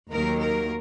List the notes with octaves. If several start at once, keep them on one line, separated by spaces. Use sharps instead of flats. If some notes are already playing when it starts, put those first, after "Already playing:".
D#2 D#3 F#3 A#3 A#4
A#4